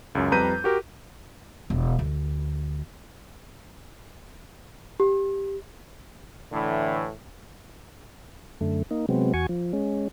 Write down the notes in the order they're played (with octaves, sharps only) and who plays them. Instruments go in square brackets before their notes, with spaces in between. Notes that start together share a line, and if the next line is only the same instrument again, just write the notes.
[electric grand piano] C#2 F#2
F2 G3 B4 A#5 G6 D#7
F#4 G4 A#4
[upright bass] E1
D2
[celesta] G4
[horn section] A2 E3 [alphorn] D3
[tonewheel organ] F#2 D3 A3
A#3 D#4
C3 F#3 G#3 B3 C4
E2 F#4 G#5 C#6
F3
G#3 C#4